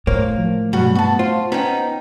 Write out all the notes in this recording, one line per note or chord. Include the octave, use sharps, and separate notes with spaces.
A2 A#3 A#4 C5 C#5
F3
G2 B2 F#3 F#4
B3 F#4 A5
F4 C5
B3 C#4 D#4 G5